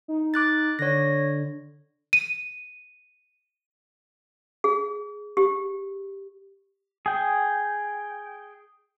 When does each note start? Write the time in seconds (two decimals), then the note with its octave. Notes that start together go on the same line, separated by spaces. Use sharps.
0.08 D#4
0.34 D6 F#6 A6
0.79 D3 C#5 A#6
2.13 D#7
4.64 G#4
5.37 G4
7.06 G#4 G5